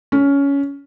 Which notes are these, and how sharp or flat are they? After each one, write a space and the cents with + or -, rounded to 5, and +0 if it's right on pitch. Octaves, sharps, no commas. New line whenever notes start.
C#4 +15